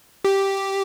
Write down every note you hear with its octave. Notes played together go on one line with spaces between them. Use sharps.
G4